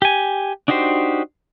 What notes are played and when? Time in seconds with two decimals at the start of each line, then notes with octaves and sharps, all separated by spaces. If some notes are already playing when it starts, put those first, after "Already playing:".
0.02 G4 G#5
0.68 D4 D#4 F#4 G4 C5